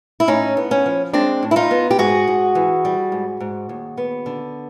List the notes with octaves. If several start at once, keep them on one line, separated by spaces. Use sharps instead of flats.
E4
A2 C#4 D#4
B3
C#4
F3
G#3 C4 D4
A2
E4
D#4 F4
B3
G4
G#2 F#4 G#4
G#2
E3
G3
G#2
G#2
D#2
B3
D3